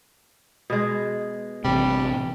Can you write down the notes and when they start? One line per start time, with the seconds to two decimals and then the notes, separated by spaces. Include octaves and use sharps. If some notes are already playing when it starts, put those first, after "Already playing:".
0.70 B2 G#3
1.65 A1 C3 G3